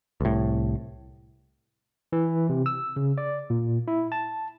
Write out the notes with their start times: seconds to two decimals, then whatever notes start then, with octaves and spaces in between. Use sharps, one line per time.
0.21 C2 A2
2.13 E3
2.49 C3
2.66 E6
2.96 C#3
3.18 D5
3.50 A#2
3.88 E4
4.12 A5